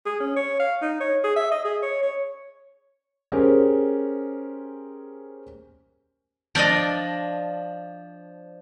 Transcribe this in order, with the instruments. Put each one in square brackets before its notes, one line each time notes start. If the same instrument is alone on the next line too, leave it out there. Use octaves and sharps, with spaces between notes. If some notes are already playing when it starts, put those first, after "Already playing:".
[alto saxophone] G#4
C#4
C#5
F5
D#4
C#5
G#4
E5
D#5
G#4
C#5
C#5
[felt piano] C#4 G4 G#4 A#4 C5
[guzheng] F3 D4 D5 D#5